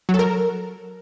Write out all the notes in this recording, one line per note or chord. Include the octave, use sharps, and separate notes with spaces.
F#3
A4
A#4